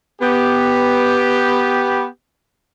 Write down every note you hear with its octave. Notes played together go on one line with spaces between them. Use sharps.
B3 G4